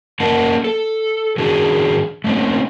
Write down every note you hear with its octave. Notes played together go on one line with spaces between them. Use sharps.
A#3 C#4 A#4 D#5 F#5 A5
A4
D#3 D4 F#4 G#4
A3 A#3 C4 C#4 D#4